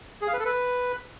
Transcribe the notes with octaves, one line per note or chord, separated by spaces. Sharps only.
G#4
F5
B4
A4
B4